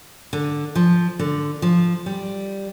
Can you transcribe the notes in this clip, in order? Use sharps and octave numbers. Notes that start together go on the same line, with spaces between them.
D3
F3
D3
F3
G3